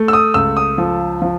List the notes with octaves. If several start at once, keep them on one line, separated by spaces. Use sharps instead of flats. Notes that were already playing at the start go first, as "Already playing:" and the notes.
Already playing: A3
E6
D#6
C#2 E6
D#6
F3
F3